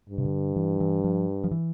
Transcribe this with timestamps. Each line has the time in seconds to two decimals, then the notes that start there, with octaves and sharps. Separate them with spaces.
0.10 G2
0.18 C3
0.25 D3
0.56 E3
0.80 E3
1.04 F3
1.44 F3
1.51 E3